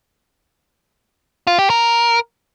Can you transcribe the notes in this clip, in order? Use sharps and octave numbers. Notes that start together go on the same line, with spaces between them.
F4
G4
A#4